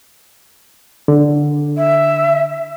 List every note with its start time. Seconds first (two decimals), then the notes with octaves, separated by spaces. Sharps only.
1.08 D3
1.77 E5